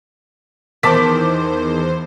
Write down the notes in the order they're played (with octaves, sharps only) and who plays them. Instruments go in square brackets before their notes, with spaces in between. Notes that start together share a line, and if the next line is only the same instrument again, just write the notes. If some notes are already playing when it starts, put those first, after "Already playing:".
[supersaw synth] E2 C5 [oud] D#3 [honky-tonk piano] A5 D6 B6